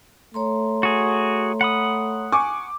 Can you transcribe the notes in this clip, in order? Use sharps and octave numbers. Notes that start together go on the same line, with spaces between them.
A3 C#5 A#5 C6
F#4 G#4
F#5 B5 D#6
G#5 C#6 D6